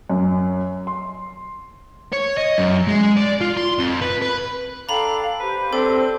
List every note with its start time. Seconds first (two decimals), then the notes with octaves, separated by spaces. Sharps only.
0.10 F#2
0.87 C6
2.12 C#5
2.37 D#5
2.58 F#2
2.87 G#3
3.17 D5
3.41 F4
3.57 C6
3.79 F2
4.01 B4
4.22 B4
4.89 D4 A4 F5 G5 A#5 B5
5.40 G4 B4 C5
5.73 C4 D4 A4